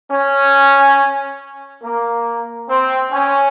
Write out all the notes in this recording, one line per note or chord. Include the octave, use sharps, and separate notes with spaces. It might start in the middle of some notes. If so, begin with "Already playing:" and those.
C#4
A#3
C4
C#4